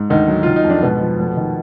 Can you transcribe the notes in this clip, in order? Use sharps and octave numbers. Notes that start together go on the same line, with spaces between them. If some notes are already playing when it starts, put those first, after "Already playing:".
Already playing: G#2
D2 D#3 D#4
F#3
D#3 F4
D#4
F2
D4
G#2 B2 B3
F3
F1
D#3